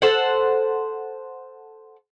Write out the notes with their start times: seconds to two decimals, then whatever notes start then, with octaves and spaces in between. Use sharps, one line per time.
0.02 A4 C5 F#5